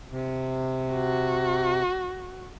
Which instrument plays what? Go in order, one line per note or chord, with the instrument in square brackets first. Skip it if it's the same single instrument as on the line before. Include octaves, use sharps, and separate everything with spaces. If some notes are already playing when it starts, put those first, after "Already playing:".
[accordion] C3
[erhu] F#4